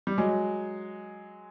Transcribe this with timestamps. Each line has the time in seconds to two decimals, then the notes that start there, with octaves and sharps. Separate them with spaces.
0.07 G3
0.18 F#3 G#3